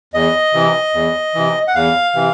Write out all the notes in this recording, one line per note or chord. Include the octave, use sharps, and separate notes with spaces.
E2 D#5
C3 E3
E2
C3 E3
F#5
E2 F5
C3 E3